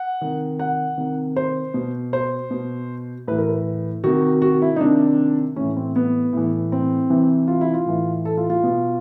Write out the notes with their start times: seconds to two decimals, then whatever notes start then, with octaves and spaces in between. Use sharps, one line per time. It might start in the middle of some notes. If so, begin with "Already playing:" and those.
Already playing: F#5
0.21 C3 D#3
0.59 F#5
0.98 C3 D#3
1.36 C5
1.74 B2
2.13 C5
2.51 B2
3.28 A2 E3 B4
3.38 A#4
3.49 B4
4.04 C3 D#3 F#4
4.42 F#4
4.62 E4
4.76 D#4
4.80 C3 D#3 D4
5.56 A2 E3 C#4
5.77 C4
5.96 B3
6.33 A2 E3
6.72 C4
7.10 C3 E3
7.48 F4
7.61 E4
7.74 F4
7.86 A2 E3
8.25 A4
8.37 F4
8.50 F4
8.64 B2